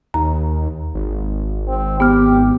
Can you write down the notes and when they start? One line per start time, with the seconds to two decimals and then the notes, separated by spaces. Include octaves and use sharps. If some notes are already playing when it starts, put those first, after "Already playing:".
0.14 D#2 A#5
0.94 G#1
1.68 C4
2.00 B3 G4 F6